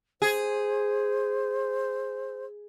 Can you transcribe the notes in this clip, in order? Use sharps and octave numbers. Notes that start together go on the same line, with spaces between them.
G#4 C5